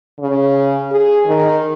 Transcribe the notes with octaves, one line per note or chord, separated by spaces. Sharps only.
C#3
G#4
D#3